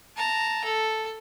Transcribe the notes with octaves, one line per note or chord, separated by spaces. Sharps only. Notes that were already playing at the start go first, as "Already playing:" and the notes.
A5 A#5
A4